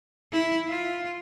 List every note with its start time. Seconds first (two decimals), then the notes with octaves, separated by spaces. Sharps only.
0.32 E4
0.68 F4